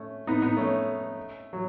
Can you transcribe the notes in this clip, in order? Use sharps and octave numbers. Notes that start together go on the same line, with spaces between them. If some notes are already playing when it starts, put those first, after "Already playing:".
Already playing: A3 C#4
B3 D#4
B3 D#4
A3 C#4
F#3